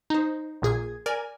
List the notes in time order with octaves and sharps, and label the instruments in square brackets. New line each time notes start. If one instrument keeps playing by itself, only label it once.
[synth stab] D#4 C5
A#1 A#2 G#4 G#6
A#4 D5 G#5